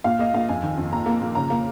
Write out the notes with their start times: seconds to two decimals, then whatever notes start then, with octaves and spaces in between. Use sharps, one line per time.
0.04 A#2 F5
0.19 A#3 D#5
0.34 A#2 F5
0.49 F2 G#5
0.63 D#3
0.78 F2
0.92 A#2 A#5
1.06 A#3
1.21 A#2
1.35 C#3 A#5
1.50 A#3